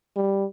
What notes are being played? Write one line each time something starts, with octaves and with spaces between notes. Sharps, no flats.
G3